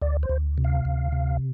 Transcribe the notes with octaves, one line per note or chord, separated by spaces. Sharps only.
D2 D5
C5
D2
C3
F5
D2
C3